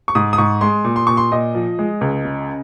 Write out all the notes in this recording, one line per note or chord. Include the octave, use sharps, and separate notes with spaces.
C#6
G#2 D#6
D#6
G#2 C#6
G#3 C6
A#2
C6
A#2 C#6
C6
A#2 D#5
F3
G#3
C#2
C#3